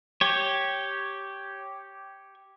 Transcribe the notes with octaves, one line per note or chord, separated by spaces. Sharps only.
G4 C#5